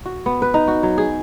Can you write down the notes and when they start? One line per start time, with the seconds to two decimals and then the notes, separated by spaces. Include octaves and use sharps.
0.05 F#4
0.26 B3
0.42 B4
0.54 D#4
0.68 F#4
0.83 F#3
0.98 G#4